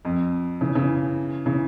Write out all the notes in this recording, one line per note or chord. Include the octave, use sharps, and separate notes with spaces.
F2
C#3 E3
C#3 E3
C#3 E3